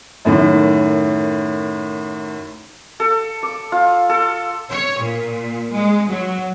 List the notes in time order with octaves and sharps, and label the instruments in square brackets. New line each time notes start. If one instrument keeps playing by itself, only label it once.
[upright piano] F#2 A2 D#3
[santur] A4
D6
F4
A4
[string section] C#5
A#2
G#3
F#3